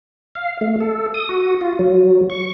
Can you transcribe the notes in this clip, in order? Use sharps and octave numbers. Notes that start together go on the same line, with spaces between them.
F5
A3
A4
D#6
F#4
F4
F#3
C#6